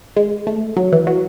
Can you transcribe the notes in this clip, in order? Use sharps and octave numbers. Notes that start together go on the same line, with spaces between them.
G#3
A3
F#3
E3
F#3